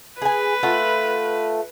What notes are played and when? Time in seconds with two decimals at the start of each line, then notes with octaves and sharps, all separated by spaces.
0.22 G#4 B4 G#5
0.63 A3 F4 F#5